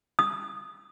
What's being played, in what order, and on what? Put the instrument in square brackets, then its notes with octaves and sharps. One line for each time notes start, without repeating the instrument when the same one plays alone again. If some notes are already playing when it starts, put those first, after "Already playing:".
[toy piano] D#6